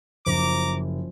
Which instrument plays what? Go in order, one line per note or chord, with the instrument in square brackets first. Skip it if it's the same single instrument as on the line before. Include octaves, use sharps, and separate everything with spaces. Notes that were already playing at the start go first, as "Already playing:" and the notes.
[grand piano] F#1 [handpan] F3 C5 [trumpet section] A#5 D6